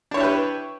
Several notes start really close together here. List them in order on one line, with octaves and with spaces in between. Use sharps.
D4 C#5 E4 G4 B4